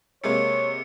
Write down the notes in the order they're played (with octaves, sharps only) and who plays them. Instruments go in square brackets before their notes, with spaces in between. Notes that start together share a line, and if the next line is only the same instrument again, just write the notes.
[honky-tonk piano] C3 G#3 A#3 [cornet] C#5 [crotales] C#7